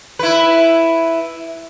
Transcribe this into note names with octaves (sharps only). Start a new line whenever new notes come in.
E4 B4